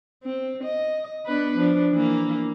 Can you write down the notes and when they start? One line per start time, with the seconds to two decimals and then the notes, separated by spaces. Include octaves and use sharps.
0.23 C4
0.64 D#5
1.26 B3 D4 B4
1.58 F3 D4
1.92 E3 A#3